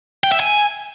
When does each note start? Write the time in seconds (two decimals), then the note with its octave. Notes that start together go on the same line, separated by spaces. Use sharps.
0.24 G5
0.32 E5
0.40 G#5